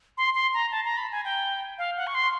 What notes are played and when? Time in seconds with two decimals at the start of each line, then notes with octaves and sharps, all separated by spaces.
0.17 C6
0.35 C6
0.54 A#5
0.71 A5
0.85 A#5
0.98 B5
1.12 G#5
1.25 G5
1.78 F5
1.97 F#5
2.07 C#6
2.15 C6